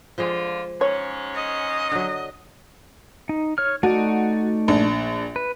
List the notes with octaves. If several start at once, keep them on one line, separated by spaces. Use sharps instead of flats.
D3 F3 G#3 F4 G#4
G#2 C#4 C#5
D#5
D3 F#3
D#4
C#5 F6
A3 D#4 F#4 D5
A#1 D4
B4